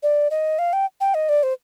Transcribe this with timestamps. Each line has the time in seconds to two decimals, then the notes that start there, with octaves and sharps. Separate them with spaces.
0.03 D5
0.31 D#5
0.59 F5
0.73 G5
1.01 G5
1.14 D#5
1.29 D5
1.43 C5